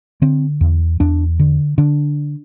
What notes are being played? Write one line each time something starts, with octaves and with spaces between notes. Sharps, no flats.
D3 C4
E2
E2 D4
D3
D3 D4